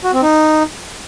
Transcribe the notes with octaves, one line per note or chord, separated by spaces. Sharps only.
F#4
C4
D#4